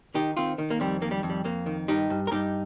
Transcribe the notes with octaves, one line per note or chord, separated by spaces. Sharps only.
D#3 D#4 G4
D#3 C4 F4
D#3
A#3
F2 G3 C4
D#3 A#3
G3
F2
G3
F2 A#3
D#3
G2 D#4 G4
G2
A#4
G2 D#4 G4